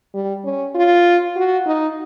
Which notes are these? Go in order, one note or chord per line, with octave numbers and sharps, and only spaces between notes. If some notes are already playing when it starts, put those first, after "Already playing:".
G3
C#4
F4
F#4
D#4